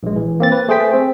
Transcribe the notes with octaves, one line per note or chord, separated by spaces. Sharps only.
A#1 G#3
E3
A#3 C4 A6
B4
A3 G#4 C5 G5 B6
C4